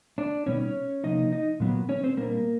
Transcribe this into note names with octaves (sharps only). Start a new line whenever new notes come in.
D4 D5
B2 G3 B3 C#4 D#4 C#5
C#4 C#5
C3 F3 A#3 D#4 D#5
D#4 D#5
A#2 F#3 B3
C#4 C#5
C4 C5
A#2 G3 A#3 B3 D4 A#4